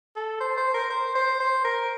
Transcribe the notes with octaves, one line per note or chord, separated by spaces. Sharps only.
A4
C5
C5
A#4
C5
C5
C5
A#4